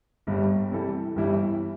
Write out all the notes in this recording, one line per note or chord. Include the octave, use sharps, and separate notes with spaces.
G1 G2 G3
C3 E3 G3 E4 A4
G1 G2 E3 G3 E4